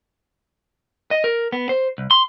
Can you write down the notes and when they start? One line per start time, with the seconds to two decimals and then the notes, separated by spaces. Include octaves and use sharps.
1.11 D#5
1.24 A#4
1.52 B3
1.69 C5
1.98 C2
2.11 C6